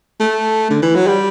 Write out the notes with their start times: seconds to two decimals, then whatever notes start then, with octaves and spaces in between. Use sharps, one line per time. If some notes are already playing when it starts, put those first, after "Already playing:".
0.20 A3
0.70 D3
0.82 E3
0.95 F#3
1.07 G3